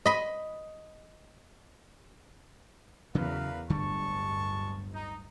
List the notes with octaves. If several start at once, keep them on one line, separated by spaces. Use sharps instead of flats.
D#5 B5
E2 C#3 E3 F#3 A#4 B4 F5
D1 G1 D3 G3 G#3 A5 C#6
D#4